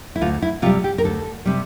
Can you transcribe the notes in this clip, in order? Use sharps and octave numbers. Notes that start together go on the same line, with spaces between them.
E4
D2 F4
E4
C3 G3 F4
G4
A#4
D2 A4
C3 G3